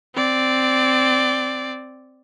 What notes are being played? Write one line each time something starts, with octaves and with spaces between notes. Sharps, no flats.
C4 D5